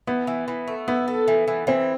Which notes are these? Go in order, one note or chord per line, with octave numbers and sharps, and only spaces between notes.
E3 B3
E3
E3
A3
B3 E4
A4
E3
E3
E3 C4